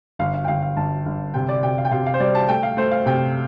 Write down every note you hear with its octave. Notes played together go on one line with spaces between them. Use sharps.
G1 F5
F5
G5
G1 F5
F5
G1 A5
G1
C3 G5
D5
C3 G5
F5
G5
C3 F5
F5
C5
G3 D5
A5
A3 G5
F5
A3 C5
F5
C3 G5